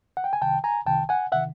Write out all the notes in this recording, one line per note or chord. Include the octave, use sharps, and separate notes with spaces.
F#5
G5
G#5
C2 C3 D#3 G5 A5
G#5 A#5
C2 C3 D#3 G5 A5
F#5 G#5
C3 D#3 E5 F#5